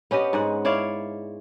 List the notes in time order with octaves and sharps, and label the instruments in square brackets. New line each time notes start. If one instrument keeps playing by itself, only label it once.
[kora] B3 C#4 G4 D#5
G#2 G#3 F#5
E4 C#5 D5 F5